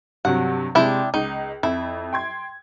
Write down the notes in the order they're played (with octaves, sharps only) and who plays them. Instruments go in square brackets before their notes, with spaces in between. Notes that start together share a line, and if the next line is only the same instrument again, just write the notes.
[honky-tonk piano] G2 C3 F#3 [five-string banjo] F#5
[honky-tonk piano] C3 G#3 [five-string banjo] D4 E4 G4
[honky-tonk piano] C#2 [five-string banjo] D#4
[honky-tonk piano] F2 [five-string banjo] E4
[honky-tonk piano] G5 C6 G#6